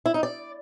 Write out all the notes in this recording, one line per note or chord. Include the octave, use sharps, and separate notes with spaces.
E4
D#4
D5